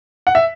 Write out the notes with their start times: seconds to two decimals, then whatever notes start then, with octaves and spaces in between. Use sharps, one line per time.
0.27 F#5
0.35 E5